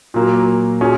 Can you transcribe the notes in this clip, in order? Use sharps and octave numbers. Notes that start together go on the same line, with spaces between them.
A#2 F#3 A#3
A#2 F#3 C#4 G#4